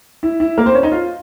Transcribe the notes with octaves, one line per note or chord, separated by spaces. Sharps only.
E4
E4
A#3 A#4
C4 C5
C#4 C#5
D#4 D#5
F4 F5